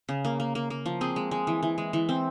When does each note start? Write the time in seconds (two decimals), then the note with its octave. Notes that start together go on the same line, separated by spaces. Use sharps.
0.09 C#3
0.25 A#3
0.40 A#3
0.55 A#3
0.70 A#3
0.86 F3
1.01 C4 G#4
1.16 G#3
1.31 G#3
1.47 E3
1.63 E3
1.78 G#3
1.93 E3
2.09 C4